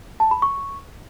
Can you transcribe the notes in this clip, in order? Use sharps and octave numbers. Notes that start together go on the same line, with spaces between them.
A5
B5
C#6